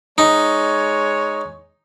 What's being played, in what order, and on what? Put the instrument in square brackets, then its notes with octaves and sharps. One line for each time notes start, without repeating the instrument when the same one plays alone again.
[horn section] G#3 C#5 [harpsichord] D#4